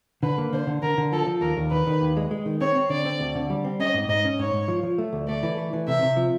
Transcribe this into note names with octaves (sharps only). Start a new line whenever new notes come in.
D3 B4
A#3
D3 C5
D3
D3 A#4
D3
F3 A4
F3
D#2 A#4
D#2
D#3 B4
D#3
D#2
G#3
G#3
D#3
C4 C#5
C4
D3 D5
C4
D2
D3
G3
C4
C#4 D#5
G#2
G#2 D#5
C#4
G#2 C#5
G#2
F3
F3
A3
D2
A3 D5
E3
A3
E3
C3 E5
C3
F3